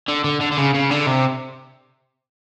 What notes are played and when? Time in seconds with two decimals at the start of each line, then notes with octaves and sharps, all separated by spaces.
0.08 D3
0.24 D3
0.41 D3
0.52 D3
0.58 C#3
0.75 C#3
0.91 D3
1.07 C3